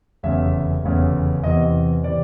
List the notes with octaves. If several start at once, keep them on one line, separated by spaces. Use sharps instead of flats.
F1 E2 C#3 E5
F1 E2 C#3
E2 C3 E3 D#5
C3 E3 D5